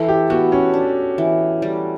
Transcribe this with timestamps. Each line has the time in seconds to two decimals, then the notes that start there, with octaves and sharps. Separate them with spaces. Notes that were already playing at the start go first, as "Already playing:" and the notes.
Already playing: E3 A4
0.08 G4
0.30 B3 F#4
0.52 C#4
0.74 D4
1.18 E3
1.62 G3